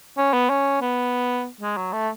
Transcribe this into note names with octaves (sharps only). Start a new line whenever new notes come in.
C#4
B3
C#4
B3
G#3
F#3
A3